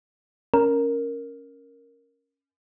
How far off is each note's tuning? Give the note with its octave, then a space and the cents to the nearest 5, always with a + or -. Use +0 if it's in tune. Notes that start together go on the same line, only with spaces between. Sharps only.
C#4 +0 A#4 +0